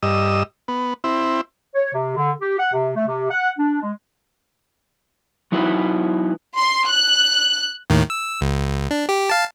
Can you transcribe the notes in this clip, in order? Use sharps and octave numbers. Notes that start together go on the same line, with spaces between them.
G2 D#5 E6
B3
C4 E4
C#5
C3
D3
G4
F#5
C3
A3
C3
F#5
D4
G#3
F#3 D#4 E4 F#4 B4
C6
F#6
D#2 A2 D#3
E6
C#2
D4
G4
F5 A5